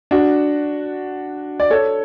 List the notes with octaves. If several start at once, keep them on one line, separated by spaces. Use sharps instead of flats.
D4 F#4
D5
A4 C#5